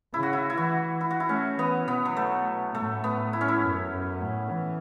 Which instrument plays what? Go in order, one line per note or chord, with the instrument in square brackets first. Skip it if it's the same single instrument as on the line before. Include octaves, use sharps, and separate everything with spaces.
[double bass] C#3 [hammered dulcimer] E4
[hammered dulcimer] F#4
E4
E4
[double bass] E3 [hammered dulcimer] F#4
[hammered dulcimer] E4
F#4
E4
[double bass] A3 [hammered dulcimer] C#4
[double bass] E3 [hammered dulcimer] B3
[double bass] B2 [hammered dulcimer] B3
[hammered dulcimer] F#3
A3
[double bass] A2 [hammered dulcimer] A3
[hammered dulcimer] B3
E4
C#4
E4
[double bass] F#2
F#2
A2
E3